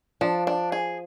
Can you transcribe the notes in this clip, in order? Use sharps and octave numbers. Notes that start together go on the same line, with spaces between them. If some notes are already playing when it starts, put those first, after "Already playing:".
F3 D4
D4
G#4